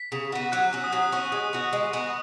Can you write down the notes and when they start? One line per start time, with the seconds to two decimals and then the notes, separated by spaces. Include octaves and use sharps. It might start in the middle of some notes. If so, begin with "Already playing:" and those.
Already playing: B6
0.12 C#3
0.32 B3 F#4
0.52 F#3 F#6
0.73 C#4 F#4
0.84 D#6
0.92 F#3 F#6
1.03 D#6
1.12 C#4 F#4 C#6
1.32 G#3 D#6
1.53 B3 F#4
1.73 G#3
1.93 B3 F#4